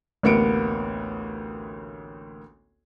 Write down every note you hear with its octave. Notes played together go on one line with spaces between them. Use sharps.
A1 D2 A#3 B3 C#7 D7